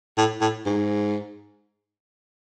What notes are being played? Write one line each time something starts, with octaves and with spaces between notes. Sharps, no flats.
A2
A2
G#2